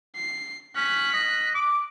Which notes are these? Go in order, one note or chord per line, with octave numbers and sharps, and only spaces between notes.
C7
C#4 F#6 B6
D#5
D6